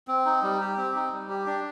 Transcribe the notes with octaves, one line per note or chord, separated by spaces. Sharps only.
C4
D#4
G3
G4
C4
D#4
G3
G4
D4